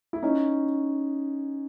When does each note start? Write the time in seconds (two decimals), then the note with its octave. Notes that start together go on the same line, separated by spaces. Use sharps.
0.13 E4
0.23 C#4 D#4